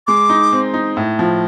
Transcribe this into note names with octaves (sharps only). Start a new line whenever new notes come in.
G#3 D6
D#4
C4
D#4
A2
F3